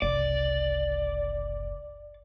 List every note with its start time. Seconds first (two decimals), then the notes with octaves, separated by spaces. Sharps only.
0.02 F#1 C2 D5